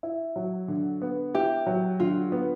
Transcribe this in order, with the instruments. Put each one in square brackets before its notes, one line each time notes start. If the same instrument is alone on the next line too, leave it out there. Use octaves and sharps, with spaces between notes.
[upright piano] E4
F#3
D3
B3
[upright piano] E4 [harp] G4
[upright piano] F#3
[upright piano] D3 [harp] F4
[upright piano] B3